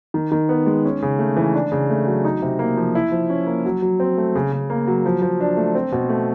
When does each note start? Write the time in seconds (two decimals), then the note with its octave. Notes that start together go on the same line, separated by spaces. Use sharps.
0.14 D#3
0.32 D#3
0.49 B3
0.66 G#3
0.85 C#4
1.02 C#3
1.19 A3
1.37 E3
1.54 D4
1.72 C#3
1.90 A3
2.07 F#3
2.25 D#4
2.42 C3
2.59 A#3
2.77 F3
2.95 E4
3.12 F3
3.30 C#4
3.47 A#3
3.65 F#3
3.82 F#3
4.00 C4
4.18 A3
4.35 C#3
4.52 C#3
4.70 A#3
4.87 F#3
5.06 F3
5.22 F3
5.41 D4
5.57 A3
5.75 C4
5.92 B2
6.09 A3